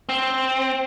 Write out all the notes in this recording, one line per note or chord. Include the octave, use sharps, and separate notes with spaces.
C4